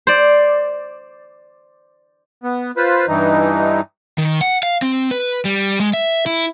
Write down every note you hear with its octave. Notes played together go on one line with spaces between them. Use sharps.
C5 D5
B3
F4 B4 C5
G2 E3 D#4
D#3
F#5
F5
C4
B4
G3
G#3
E5
E4